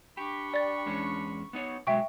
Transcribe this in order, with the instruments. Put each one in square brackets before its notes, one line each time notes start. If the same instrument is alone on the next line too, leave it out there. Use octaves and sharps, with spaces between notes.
[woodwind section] D4 B5 C#6 [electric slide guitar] G4
[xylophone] D5 A6
[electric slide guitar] E2 G#3 C#4
B3 D#4 C#5
[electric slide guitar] B2 F#3 G#3 [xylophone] E5 G5 C#6